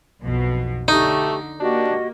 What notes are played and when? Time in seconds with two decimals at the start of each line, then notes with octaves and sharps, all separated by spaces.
0.20 B1 F2 B2
0.88 D3 A3 D#4 G4 C#6
1.60 A#3 D4 F#4 G4 D#5